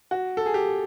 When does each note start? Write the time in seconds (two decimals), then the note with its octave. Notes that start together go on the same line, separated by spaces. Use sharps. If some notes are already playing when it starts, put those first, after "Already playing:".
0.11 F#4
0.37 A4
0.46 G#4
0.54 G4